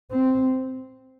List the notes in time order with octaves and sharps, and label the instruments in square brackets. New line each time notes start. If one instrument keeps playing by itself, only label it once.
[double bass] C4